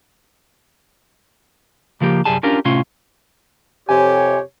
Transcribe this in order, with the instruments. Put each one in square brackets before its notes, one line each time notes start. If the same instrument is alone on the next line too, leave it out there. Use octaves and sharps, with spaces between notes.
[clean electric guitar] C#3 F3 A#3 G4
C2 F#2 G3 G#4 A5
C#4 D4 F4 G4 A#4
A2 C3 C#4 F4
[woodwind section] F2 C3 [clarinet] G4 [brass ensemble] C#5 [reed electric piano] G#5